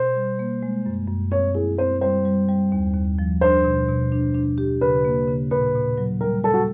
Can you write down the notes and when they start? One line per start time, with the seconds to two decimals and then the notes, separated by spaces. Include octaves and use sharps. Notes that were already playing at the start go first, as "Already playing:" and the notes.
Already playing: B2 C5
0.16 G3
0.39 A#3
0.63 G#3
0.86 F#2
1.08 F#2
1.32 C4 C#5
1.55 E4 G#4
1.78 C4 C5
2.01 G3 C5
2.25 G3
2.49 G3
2.72 D#2
2.95 D#2
3.19 F3
3.41 D4 C5
3.64 B2
3.89 B2
4.12 D4
4.34 D4
4.58 G4
4.81 C#3 B4
5.05 A#3
5.28 C#3
5.51 A#2 B4
5.75 A#2
5.98 F#3
6.21 G3 A#4
6.44 G3 A4
6.54 F#4